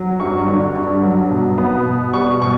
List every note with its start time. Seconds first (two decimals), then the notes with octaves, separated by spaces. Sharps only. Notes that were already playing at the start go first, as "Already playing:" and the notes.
Already playing: F#3
0.20 G2 C#6
0.48 D3
0.76 G2
1.03 F#3
1.31 B2
1.58 B3
1.86 B2
2.13 G3 C#6
2.42 B2 C#6